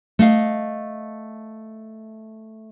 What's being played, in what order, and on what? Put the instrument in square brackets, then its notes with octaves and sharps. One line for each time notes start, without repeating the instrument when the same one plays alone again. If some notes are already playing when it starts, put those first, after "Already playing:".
[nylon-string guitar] A3 D#5 F5